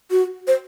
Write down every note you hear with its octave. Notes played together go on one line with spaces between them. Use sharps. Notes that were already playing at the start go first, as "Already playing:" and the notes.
F#4
C5